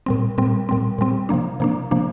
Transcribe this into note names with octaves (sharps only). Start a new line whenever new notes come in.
A#2 G3 C4
A#2 G3 C4
A#2 G3 C4
A#2 G3 C4
C3 F3 A#3 D4
C3 F3 A#3 D4
C3 F3 A#3 D4